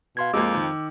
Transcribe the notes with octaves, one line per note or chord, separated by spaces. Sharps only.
B2 F5 C6 G#6
F2 G#3 A#3 D6 E6
D#3